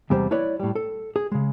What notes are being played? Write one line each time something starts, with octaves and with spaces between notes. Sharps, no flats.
E2 C3 G3 G#3 C5
E4 B4 C#5 D5
A2 G3
A4
G#4
C#3 G#3